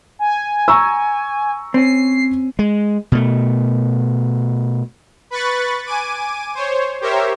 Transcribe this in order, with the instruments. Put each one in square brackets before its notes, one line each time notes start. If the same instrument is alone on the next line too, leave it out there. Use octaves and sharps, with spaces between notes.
[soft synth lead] G#5
[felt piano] A#5 C#6 E6
[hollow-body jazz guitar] C4 C#4 [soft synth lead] C7
[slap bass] G#3
B2 A3
[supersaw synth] B4 B5 C#6 F#6 A6
G#5 D6 D#7
C5 C#5
G4 A#4 C5 C#5 E5